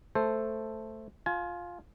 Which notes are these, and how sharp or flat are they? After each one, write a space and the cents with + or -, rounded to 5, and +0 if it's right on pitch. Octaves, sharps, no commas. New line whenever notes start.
A3 +0 A4 +0 C5 +0
F4 +10 G#5 +35